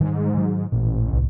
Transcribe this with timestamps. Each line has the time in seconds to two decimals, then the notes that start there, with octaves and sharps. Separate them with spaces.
0.01 G#2 D#3 G3 G#3
0.33 D#3 F#3
0.72 A1 A#2
1.09 C2 A2